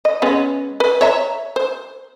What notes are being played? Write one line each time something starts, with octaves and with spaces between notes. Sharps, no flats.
D#5
G#3 B3 C#4
B4
C#5 E5 A#5
C5